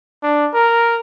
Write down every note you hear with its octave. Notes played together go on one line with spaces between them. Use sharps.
D4
A#4